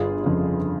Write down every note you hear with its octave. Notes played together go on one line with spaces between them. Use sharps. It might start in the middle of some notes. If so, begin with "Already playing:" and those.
Already playing: G1 F4 G#4
F2 C#3